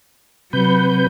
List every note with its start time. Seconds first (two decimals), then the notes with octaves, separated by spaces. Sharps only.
0.53 C3 F#3 B4 G6